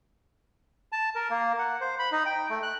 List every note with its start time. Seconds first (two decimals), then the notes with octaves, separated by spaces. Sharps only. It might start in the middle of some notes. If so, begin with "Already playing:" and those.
0.92 A5
1.15 A#4
1.30 A#3
1.59 F#5
1.81 C5
1.99 B5
2.12 D#4
2.26 G5
2.50 A3
2.63 F#6